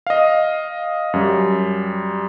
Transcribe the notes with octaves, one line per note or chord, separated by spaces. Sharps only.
D#5 F5
F#2 G3